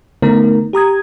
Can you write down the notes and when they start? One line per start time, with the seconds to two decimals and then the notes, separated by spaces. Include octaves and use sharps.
0.22 D3 A3 B3 D#4 A#4
0.73 G4 A#5 D#6 G#6